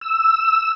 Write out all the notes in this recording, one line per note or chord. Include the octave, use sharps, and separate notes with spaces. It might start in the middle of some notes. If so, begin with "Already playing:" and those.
E6